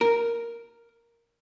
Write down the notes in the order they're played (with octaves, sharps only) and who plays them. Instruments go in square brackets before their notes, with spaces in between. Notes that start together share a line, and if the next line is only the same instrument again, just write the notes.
[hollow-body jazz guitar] A#4